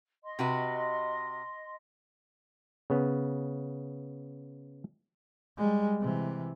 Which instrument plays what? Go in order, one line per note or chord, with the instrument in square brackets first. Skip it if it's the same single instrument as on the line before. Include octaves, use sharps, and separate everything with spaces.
[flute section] D#5 C6
[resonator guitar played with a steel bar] C3 F#4 B4
[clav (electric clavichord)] C#3 B3
[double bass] G3 G#3
C3 E3